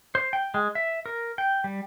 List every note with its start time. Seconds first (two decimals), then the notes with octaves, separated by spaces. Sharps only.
0.15 C5
0.33 G5
0.54 G#3
0.75 E5
1.06 A#4
1.38 G5
1.64 G3